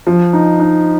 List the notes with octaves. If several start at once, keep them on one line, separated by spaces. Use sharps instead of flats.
F3
D#4
D#4